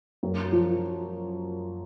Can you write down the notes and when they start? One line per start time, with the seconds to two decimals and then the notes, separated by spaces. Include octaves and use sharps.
0.23 F#2
0.52 F3